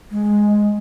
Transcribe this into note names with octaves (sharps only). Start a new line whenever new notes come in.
G#3